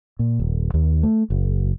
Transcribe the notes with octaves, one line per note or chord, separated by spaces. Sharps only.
A#2
D#1
D#2
A3
F#1